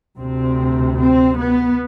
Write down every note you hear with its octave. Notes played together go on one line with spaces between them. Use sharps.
D2 C3 C4
C4
B3